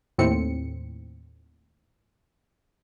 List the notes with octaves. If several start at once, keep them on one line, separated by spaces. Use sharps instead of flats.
D#2 A2 C4 C#7